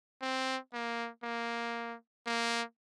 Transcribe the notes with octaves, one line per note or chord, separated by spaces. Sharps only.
C4
A#3
A#3
A#3